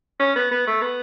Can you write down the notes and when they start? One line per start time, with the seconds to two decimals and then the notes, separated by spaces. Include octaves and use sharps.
0.20 C#4
0.36 B3
0.51 B3
0.67 A3
0.82 B3